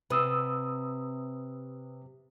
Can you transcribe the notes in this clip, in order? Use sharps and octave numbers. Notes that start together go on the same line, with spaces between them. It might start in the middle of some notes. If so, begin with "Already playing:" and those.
C3 B4 D#6 E6